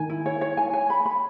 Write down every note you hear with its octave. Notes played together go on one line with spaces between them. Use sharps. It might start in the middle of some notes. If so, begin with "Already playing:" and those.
Already playing: D#3 G#5
E4
C#5
C#5
G#5
G#5
B5
B5